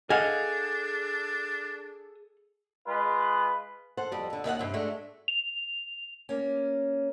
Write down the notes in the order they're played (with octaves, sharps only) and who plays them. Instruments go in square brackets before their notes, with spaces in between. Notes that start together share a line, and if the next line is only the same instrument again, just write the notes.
[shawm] D4 [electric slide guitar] G#4 A4 [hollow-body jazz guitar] D#5 F5 F#5 [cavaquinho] G#5
[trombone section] G#3 F4 B4
[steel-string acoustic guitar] A4 C5 F#5
F2 G3
F2 D3
D#2 D#3 F5 F#5
G2 C3
G#3 A3 D4 F#4
[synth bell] F7
[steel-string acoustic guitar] A#3 C#4